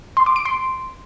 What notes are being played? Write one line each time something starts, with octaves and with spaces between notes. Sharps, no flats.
C6
D6
D7
C6